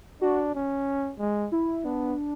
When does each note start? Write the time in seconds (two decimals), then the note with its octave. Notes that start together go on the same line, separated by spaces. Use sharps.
0.21 D4 F#4
0.55 C#4
1.19 G#3
1.52 E4
1.84 B3 D4